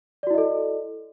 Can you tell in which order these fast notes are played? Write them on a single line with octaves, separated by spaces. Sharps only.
D5 F#4 E4 D#5 A4